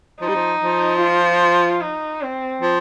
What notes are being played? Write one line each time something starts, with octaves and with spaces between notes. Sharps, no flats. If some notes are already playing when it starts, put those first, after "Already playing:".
F3 D#4
G3
F3
F3
F4
D#4
C4
F3